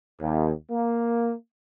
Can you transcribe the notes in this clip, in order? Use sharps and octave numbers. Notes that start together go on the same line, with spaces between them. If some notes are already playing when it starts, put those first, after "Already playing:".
D#2
A#3